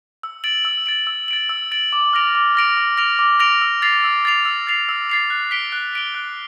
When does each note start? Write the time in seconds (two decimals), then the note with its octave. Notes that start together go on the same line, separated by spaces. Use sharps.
0.23 E6
0.44 A6 D7 F#7
0.65 E6
0.86 A6 D7 F#7
1.07 E6
1.28 A6 D7 F#7
1.49 E6
1.71 A6 D7 F#7
1.93 D6
2.13 F6 A#6 D7 F7
2.35 D6
2.55 F6 A#6 D7 F7
2.77 D6
2.97 F6 A#6 D7 F7
3.19 D6
3.39 F6 A#6 D7 F7
3.62 E6
3.82 A6 C7 F7
4.04 E6
4.25 A6 C7 F7
4.45 E6
4.67 A6 C7 F7
4.89 E6
5.10 A6 C7 F7
5.30 F#6
5.51 B6 D7 G7
5.72 F#6
5.93 B6 D7 G7
6.14 F#6